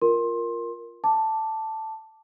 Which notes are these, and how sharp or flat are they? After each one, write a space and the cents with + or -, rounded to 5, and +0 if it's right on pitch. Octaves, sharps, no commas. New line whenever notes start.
F4 +0 A#4 +0 C6 +20
A5 +5 D6 +0